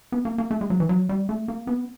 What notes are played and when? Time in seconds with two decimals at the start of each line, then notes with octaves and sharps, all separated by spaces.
0.12 B3
0.25 A#3
0.38 A#3
0.51 A3
0.61 G#3
0.70 F#3
0.80 E3
0.89 F#3
1.09 G3
1.29 A3
1.48 A#3
1.67 B3